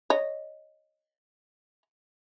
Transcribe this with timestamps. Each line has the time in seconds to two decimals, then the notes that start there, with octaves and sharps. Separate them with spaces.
0.10 C#5 D#5